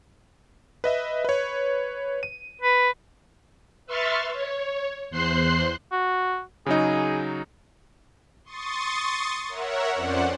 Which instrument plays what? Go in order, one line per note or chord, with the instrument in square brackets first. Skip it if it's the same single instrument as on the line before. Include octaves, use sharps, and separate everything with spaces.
[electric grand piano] B4 D#5 E5
B4 C#5
D#7
[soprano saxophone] B4
[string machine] B4 E5 C6 C#6 F6 A6
C#5
E2 C5 C6 F#6 C7
[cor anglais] F#4
[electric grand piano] C#3 F#3 D#4 [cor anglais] G#4
[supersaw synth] C6 C#6 D#6 A6
A#4 C#5 E5 F#5
F2 C#4 C5 D5 F#5